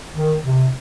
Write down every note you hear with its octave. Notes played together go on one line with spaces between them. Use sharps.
D#3
C3